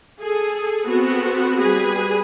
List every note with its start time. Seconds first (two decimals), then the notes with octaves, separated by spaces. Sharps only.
0.21 G#4 A4
0.86 B3 C4 F#4 A4
1.58 G3 G#4 B4